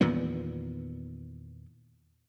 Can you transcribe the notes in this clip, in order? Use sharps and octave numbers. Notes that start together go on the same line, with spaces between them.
E2 A#2 D#3 B3